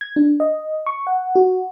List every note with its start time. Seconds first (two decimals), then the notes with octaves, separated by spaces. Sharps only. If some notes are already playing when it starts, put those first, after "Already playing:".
0.01 G#6
0.16 D4
0.40 D#5
0.86 C#6
1.07 F#5
1.35 F#4